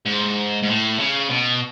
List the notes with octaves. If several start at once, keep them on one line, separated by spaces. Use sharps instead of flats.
G#2
G#2
A2
C#3
B2